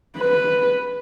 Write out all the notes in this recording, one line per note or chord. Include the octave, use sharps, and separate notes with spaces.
B4